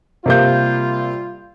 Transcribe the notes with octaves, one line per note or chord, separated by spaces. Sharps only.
C3 G3 A#3 F4 G6